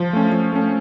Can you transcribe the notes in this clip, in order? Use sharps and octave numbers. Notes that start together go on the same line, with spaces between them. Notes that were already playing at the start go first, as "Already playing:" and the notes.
Already playing: F3
A3 C#4
F3
A3 C#4